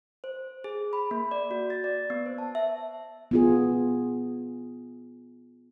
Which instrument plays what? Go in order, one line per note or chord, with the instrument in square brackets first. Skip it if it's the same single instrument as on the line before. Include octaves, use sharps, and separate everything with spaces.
[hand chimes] C5
G#4
B5
A#3
D5
F#4
A6
D5
B3
C5
A5
E5
[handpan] B3 F4 G#4